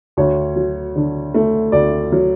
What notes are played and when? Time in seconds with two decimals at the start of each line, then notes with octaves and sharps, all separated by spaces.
0.17 D2 C#5
0.56 F#3
0.96 D3
1.34 A3
1.72 D2 D5
2.12 F#3